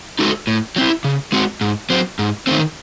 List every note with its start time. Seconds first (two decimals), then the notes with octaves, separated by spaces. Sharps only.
0.19 G#3 D#4 F#4 A4
0.47 A2
0.76 F#3 C4 E4
1.04 C#3
1.32 G#3 C4 F#4
1.61 G#2
1.90 F#3 C4
2.19 G#2
2.47 D#3 A3 C4